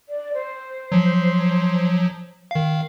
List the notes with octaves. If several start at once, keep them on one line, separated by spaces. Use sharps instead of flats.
D5
C5
F3 F#3
D#3 F5